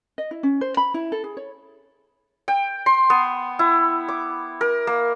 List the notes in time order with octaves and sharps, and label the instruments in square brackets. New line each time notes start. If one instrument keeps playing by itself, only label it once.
[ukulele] D#5
E4
C#4
C5
B5
E4
A4
G#4
C#5
[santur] G5
C6
B3
E4
D6
A#4
A#3